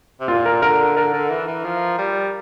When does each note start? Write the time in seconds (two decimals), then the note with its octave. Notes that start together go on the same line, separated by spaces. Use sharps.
0.20 C3
0.28 A#2 F4
0.46 A#4
0.62 D3 A#4
0.97 D3 A#4
1.13 D3
1.30 E3
1.47 E3
1.64 F3
1.98 G3